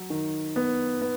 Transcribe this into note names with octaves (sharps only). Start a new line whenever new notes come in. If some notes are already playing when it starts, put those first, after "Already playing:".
Already playing: F#3
D#3
B3
B3